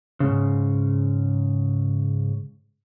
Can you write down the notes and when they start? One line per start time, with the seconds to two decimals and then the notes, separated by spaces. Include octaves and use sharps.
0.20 G#2 C#3